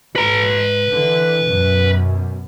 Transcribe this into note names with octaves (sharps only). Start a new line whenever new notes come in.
G#2 B4 A#5
D3 E3
F#2 B2